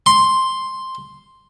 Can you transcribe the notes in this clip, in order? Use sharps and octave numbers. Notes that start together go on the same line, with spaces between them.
C6